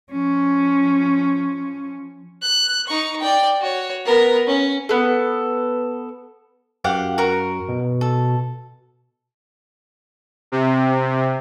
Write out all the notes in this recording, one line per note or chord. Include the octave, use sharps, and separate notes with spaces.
F3 C#4
F#6
D#4 C#6
D5 G5
F#4 C#5
B3 A#4
C#4
B3 A4
F#2 G4 F5 F#5
F#4 A#4
B2
A4
C3